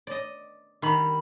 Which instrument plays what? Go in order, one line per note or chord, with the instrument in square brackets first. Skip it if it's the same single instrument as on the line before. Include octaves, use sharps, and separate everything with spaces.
[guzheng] D5 D#5
[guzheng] D#3 [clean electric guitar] G3 B5